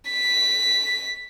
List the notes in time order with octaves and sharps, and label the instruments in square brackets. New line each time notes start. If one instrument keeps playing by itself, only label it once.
[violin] B6